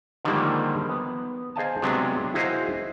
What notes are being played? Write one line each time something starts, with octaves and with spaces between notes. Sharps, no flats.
D3 D#3 F3 G3 G#3 A#3
B3
G#4 C5 D#5 F5 G#5 A5
C3 F#3 G#3 B3 D4
E4 F#4 G#4 C5 D#5 F5